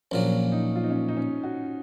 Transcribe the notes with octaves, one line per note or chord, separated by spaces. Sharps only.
A#1 A#2 F#3 C#4
D#4
F4
D#4
C#4
D#4
C#4
F#4